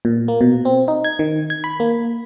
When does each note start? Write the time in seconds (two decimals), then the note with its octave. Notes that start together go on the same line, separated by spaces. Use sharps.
0.05 A#2
0.28 A#3
0.41 B2
0.65 C4
0.88 D#4
1.04 G#6
1.19 D#3
1.50 G#6
1.64 B5
1.80 A#3